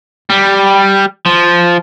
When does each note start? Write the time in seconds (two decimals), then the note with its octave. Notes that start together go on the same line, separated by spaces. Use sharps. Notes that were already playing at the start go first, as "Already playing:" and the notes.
0.30 G3
1.26 F3